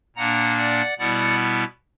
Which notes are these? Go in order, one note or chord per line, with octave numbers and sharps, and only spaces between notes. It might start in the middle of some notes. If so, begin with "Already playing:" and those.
A#2 A#3 D4 F#5 A#5
D5 F#5
B2 G3 B3 E4 D5 F#5